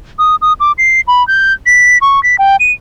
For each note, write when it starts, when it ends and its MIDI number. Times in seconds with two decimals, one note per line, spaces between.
0.19 0.36 87
0.42 0.53 87
0.60 0.72 86
0.78 1.01 96
1.08 1.26 83
1.28 1.53 91
1.66 1.98 95
2.01 2.22 85
2.23 2.36 95
2.39 2.56 79
2.60 2.72 99